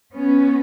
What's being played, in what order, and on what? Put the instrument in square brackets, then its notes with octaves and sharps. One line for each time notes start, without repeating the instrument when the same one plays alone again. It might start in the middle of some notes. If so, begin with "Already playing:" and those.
[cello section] B3 C#4